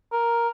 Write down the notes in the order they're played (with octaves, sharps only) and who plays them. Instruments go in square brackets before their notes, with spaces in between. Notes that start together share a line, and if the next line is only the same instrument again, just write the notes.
[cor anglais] A#4